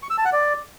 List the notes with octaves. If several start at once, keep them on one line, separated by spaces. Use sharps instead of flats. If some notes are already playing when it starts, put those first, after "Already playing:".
C#6
E6
A5
F#5
D5